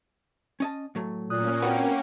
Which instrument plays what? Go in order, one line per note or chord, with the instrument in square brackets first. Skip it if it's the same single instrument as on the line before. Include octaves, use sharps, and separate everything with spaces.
[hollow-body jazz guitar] C#4 D#5 A5
A2 F#3 A3
[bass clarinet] A#2 [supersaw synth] A#3 C#4 [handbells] D#6 F#6
[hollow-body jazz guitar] C4 F#4 B4 [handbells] F#5 G5